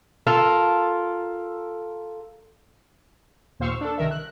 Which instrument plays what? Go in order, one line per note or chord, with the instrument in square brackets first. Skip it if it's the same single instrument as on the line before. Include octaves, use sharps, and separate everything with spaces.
[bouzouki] F4 A4 A#4
[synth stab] D#2 A#2 C5 F5 C#6 E6
D4 A4
C2 D#3 A#4 E5
F#6